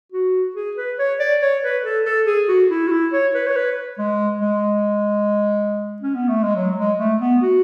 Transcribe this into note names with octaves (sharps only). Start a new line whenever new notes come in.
F#4
G#4
B4
C#5
D5
C#5
B4
A4
A4
G#4
F#4
E4
F#4
E4
C#5
B4
C#5
B4
G#3
G#3
C#4
B3
A3
G#3
F#3
G#3
A3
B3
F#4